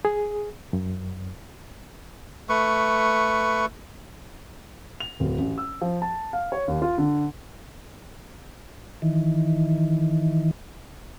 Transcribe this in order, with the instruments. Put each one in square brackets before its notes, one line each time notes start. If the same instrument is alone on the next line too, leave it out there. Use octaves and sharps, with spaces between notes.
[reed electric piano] G#4
F#2
[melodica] A3 B4 C#6
[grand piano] F7
D1
A1
E6
F3
A5
F5
C#5
D#2
F4
D3
[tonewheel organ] D#3 E3